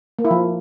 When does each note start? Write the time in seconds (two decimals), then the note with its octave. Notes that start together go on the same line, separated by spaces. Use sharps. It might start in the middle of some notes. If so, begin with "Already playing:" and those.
0.19 A#3
0.25 E4
0.31 F3